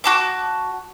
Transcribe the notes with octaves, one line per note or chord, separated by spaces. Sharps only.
F#4 A5 D6